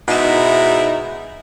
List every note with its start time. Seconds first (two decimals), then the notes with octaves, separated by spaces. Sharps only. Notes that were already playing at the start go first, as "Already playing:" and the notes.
0.08 G#2 B2 G#3 D#4 E4 E5